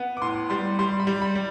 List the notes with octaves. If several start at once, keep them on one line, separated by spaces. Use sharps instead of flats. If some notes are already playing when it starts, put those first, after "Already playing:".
Already playing: B3
D6
A2 C6
G3 C6
G3 C6
B5
G3
B5
G3